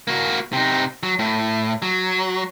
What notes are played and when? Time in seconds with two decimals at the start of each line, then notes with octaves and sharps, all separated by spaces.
0.07 A#3 F#4
0.53 C3 D#4
1.03 F#3
1.19 A2
1.82 F#3